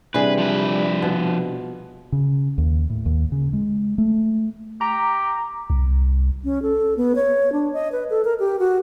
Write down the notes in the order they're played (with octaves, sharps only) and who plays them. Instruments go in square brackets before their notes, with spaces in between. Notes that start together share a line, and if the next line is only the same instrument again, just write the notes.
[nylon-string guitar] C3 D4 G#4 [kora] E3 [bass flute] G3 [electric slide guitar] B4
[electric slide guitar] F3 B4
[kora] B2
[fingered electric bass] C#3
D#2
A2
D#2
C#3
G#3
A3
[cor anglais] G4 [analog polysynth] A#5
[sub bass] C2
[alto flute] C#4
A4
B3
C#5
D4
D#5
B4
A4
A#4
G4
F#4